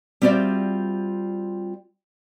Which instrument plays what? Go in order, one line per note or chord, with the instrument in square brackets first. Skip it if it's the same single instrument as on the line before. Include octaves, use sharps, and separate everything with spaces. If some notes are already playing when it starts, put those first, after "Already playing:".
[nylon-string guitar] G3 C4 F4 F#4 D5 E5